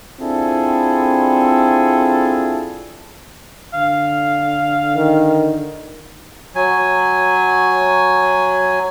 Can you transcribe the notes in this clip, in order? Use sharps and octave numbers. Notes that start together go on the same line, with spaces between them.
C4 D4 E4 F4 G#4 A4
D3 F5
D#3
F#3 G#5